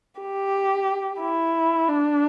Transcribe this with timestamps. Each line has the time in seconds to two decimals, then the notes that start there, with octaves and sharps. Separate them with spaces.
0.21 G4
1.21 E4
1.88 D4